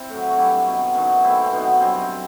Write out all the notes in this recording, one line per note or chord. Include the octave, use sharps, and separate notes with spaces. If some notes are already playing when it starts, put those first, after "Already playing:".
Already playing: C4 E4
A2 F#3
F#4
G2 F#3 E4 G4
B2 F#3
F#2 E3 D#4 F#4
A2 E3 C4 E4
C4
B2 F#3 B3 D#4
G2 F#3 C4 E4